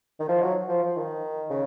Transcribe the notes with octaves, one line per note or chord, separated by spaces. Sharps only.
D#3
F3
F#3
F3
F3
D#3
C#3